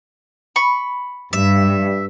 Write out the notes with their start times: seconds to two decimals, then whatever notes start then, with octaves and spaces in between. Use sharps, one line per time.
0.56 B5 C#6
1.33 G2 E5